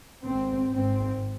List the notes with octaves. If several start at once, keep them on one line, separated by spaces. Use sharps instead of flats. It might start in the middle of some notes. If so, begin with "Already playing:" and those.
G#1 G#2 C4
G#1 G#2 C4